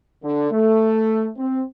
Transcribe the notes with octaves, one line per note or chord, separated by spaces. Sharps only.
D3
A3
C4